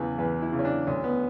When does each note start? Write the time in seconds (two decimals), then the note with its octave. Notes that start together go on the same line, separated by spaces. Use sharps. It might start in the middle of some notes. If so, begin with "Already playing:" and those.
Already playing: E2 C#3 E3 B4
0.18 E2 B4
0.42 E4
0.52 C#3 E3
0.59 C#4
0.65 D4
0.87 D2 C#4
1.04 B3